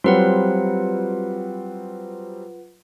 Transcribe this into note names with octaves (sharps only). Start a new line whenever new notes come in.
F#3 G3 C4 F4 B4 F#5